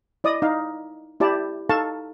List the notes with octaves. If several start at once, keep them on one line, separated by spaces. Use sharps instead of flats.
E4 D5 D#5 D#6
D#4 F5
E4 G4 D5 A5
D#4 A4 F5 A5 C#6